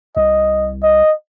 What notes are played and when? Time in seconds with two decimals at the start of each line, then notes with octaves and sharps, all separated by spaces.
0.17 C2 D#5
0.83 D#5